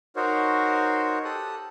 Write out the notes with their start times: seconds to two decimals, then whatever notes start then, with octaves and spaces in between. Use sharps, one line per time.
0.16 D#4 F#4 A#4 C5 C#5
1.25 G4 A4 A5 D#6 F#6